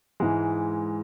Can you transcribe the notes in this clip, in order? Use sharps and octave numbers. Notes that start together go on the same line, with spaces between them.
G#2 E3 G#3